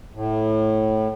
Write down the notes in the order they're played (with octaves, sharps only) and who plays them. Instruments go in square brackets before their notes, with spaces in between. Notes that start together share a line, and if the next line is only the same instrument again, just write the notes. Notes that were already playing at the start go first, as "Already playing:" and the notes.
[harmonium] A2